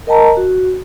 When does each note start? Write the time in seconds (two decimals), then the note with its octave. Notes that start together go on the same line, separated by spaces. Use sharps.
0.07 A#4 D#5 G5 A5 A#5
0.37 F#4